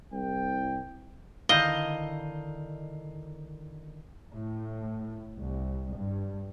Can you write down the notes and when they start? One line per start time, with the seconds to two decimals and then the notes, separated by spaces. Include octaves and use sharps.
0.12 C2 G5
1.49 D3 D#3 E4 D#5 F5 G6 G7
4.32 A2
5.37 C2
5.96 G2